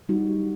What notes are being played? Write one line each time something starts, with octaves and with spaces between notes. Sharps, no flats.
G3 D#4 F#4